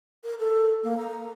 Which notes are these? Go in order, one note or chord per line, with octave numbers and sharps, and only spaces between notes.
A#4
A4
A#3
A#5